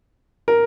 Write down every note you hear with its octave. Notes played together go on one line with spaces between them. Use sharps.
A#4